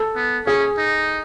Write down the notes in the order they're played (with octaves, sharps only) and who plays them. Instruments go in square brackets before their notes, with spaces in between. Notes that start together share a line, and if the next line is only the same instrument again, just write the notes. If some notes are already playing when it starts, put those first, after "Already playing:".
Already playing: [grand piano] A4
[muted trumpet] B3
[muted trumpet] C#4 [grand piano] G#4
[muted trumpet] D#4